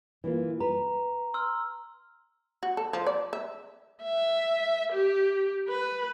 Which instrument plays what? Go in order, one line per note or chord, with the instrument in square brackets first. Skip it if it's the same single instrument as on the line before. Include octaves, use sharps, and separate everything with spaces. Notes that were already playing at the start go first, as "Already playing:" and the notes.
[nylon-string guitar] E3 A#3 F4
[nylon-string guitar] B4 [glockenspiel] A#5
[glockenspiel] C6 E6 F6
[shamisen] F#4
A4
F3
D5
E5
[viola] E5
G4
B4